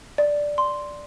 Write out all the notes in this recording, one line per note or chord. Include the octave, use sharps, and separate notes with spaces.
D5
C6